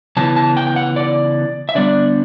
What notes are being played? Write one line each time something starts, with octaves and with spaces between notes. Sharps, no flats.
C#3 E3 B3 A5
A5
G5
G5
F#5
D5
E5
D3 G3 B3 D4 D5